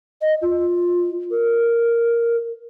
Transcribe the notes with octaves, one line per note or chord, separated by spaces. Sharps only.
D#5
F4
A#4